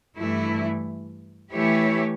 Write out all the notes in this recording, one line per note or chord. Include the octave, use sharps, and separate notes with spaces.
G2 E3 A3 E4
E3 A3 E4 G4 C#5